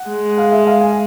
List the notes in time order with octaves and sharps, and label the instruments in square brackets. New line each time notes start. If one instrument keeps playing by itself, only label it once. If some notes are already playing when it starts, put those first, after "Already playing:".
Already playing: [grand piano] F#5
[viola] G#3
[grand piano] F5
E5
F5
G#5